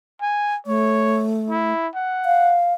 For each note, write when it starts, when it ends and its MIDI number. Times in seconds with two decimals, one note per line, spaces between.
0.22 0.57 80
0.67 1.73 57
0.67 1.29 73
1.50 1.88 64
1.95 2.59 78
2.25 2.74 77